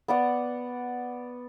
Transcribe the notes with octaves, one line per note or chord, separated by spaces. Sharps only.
B3 D5 F#5